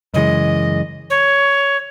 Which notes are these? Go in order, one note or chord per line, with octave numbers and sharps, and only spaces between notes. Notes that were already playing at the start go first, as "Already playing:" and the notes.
F#2 C#3 E3 G#3 D#5
C#5